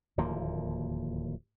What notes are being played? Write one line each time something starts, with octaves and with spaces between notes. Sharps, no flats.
D1 D#2 F3 A#3